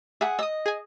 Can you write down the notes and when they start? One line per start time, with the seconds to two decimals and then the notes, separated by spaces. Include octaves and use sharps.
0.21 G#4 E5 F#5
0.39 D#5 D#6 E6
0.66 G#4 G#5